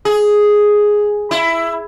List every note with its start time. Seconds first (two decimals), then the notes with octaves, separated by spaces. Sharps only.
0.05 G#4
1.31 E4